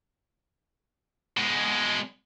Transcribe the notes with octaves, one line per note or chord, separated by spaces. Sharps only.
B2 G#3